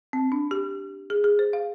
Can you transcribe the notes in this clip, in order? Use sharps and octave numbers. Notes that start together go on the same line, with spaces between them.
C4
D4
G4
G#4
G#4
C5
F5